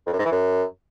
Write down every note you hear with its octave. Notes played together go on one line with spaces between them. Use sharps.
F2
F#2
G#2
E3
F#2